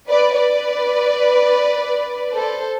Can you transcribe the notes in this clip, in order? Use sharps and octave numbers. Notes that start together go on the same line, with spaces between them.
B4 D5
B4 D5
A4 C5